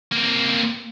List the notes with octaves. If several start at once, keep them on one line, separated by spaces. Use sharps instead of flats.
A#3 C4